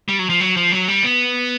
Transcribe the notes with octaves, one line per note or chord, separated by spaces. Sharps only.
G3
F#3
F3
F#3
F3
F#3
G3
B3